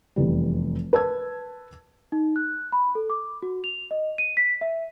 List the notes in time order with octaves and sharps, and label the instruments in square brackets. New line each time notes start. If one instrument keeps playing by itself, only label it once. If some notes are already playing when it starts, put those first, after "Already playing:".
[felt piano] F1 E2 G3
B4 A5 E6 G#6
[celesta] D#4
F#6
B5
A4
D6
F#4
F7
D#5
D#7
B6
E5